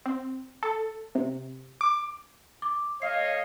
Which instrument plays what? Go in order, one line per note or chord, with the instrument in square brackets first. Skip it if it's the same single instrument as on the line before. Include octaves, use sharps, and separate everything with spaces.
[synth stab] C4
A4
C3
D6
[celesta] D6
[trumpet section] A3 C#5 D#5 [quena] F5 [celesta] C7